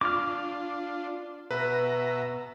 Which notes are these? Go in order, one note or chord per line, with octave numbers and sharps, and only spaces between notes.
D4 F4 D6 F6
B2 B4 E5 A#5